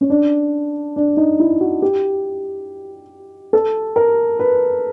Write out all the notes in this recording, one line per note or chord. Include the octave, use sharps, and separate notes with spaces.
C#4
D4
D4
D#4
E4
F#4
G4
A4
A#4
B4